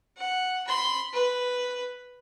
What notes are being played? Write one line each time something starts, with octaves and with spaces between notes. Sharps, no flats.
F#5
B5 C6
B4